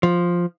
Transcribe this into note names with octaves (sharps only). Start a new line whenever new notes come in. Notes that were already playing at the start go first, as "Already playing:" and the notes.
F3